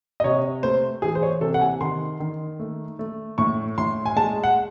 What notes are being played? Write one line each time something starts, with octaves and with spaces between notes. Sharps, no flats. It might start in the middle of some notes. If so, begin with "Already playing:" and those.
D#5
C3 C#5
A3 C5
E3 G#4
C5
C#5
C3 A4
F#5
G#5
D#3 C6
D#3
A3
A3
A2 C#6
A2 C6
G#5
G#3 A5
F#5